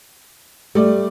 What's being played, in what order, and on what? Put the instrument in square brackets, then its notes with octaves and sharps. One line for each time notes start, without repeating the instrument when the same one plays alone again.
[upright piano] G3 D5 [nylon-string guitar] A3